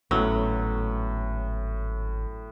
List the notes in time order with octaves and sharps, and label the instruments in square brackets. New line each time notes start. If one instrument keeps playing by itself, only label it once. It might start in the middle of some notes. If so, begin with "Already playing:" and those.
[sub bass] G#1 [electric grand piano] A2 [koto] F#3 [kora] A3 B3 C#4